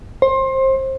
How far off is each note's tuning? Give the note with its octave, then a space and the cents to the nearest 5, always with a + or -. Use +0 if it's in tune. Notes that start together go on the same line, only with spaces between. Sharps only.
C5 +25